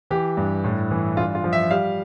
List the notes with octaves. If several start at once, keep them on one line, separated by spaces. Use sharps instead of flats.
E3 G4
G2
A2
E3
G2 F4
F4
F3
E5
G3 F5